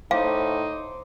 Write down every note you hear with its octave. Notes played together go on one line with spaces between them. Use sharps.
A2 D#4 C5 F5 C6 D6